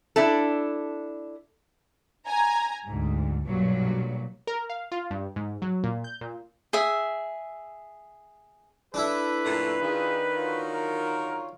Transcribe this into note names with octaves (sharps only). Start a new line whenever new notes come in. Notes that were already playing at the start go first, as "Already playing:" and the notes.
D4 E4 A4
G#5 A#5
D2 G#2
B1 G2 A#2 F#3
A#4
F5
F4
G2
G#2
F#3
A#2
G6
A#2
G#4 E5
D4 E4 A4 B4
F#2 A#2 A3
D#3 F4 G#4
F4 F#4 C#5
A#4